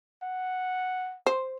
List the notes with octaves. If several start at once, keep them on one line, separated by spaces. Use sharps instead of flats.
F#5
C5